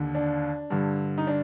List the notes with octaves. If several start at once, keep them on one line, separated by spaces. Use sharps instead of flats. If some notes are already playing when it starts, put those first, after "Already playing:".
Already playing: D#2 D3
D4
G2 D3
D#4
D4